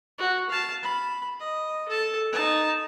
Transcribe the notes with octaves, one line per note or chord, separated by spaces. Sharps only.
F#4
F5 A5
B5
D#5
A4 A5
D#4 A5